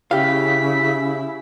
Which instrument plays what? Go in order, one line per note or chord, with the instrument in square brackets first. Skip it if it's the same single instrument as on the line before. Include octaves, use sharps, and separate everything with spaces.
[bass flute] C#3 [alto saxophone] E4 [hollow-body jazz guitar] G4 F5 [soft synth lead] B6